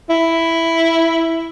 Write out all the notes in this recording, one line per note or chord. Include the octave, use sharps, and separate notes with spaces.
E4